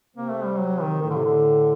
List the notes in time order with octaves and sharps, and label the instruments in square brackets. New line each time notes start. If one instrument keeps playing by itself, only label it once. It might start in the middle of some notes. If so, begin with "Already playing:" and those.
[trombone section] C3 C4 [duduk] A#3
[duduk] A3
G3
F#3
D#3
[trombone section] A2 A3 [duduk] D#3
[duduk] D3
C3
D3